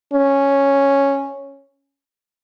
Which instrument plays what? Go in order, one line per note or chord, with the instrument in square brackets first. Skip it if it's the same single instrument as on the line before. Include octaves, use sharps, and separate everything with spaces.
[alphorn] C#4